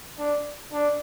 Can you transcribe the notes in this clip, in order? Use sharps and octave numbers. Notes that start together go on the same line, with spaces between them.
D4
D4